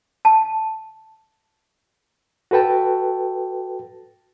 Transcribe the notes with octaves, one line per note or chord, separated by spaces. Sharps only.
A5
F#4 A4 B4 G5 A5